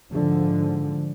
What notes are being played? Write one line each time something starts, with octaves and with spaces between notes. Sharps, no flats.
G#2 D3 F3